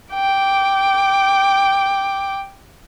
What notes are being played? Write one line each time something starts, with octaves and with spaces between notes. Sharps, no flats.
G5 D6